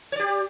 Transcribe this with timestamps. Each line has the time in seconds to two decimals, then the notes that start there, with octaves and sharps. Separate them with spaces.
0.12 C#5
0.16 D5
0.19 G4